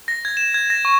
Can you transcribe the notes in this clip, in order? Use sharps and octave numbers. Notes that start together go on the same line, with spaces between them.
A#6
G#6
E7
G#6
A#6
C#6